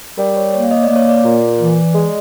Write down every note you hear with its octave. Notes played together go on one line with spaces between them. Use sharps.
G3 A#4
C#5
A#3 C#5
D#5
A#3 D5
C#5
D5
A#2
E3
G#3